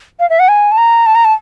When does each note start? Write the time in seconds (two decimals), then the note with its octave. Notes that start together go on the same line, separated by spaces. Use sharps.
0.20 F5
0.30 E5
0.39 F#5
0.48 G#5
0.72 A5
0.77 A#5
1.06 A5
1.15 A#5
1.24 A5